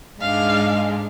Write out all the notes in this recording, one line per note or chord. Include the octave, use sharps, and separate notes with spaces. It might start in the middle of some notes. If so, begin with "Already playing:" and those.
G#2 G#3 D4 F5